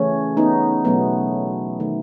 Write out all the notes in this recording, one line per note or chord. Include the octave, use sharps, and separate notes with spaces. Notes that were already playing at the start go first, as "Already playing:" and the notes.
Already playing: C#3 E3 A3 C#4
B3 D#4
B2 F#3 A3 B3
D#3 A3